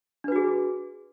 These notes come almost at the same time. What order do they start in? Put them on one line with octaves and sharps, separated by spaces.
D4 B4 F#4 G#4